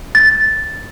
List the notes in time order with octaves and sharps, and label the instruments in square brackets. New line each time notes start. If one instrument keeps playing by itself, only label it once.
[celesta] A6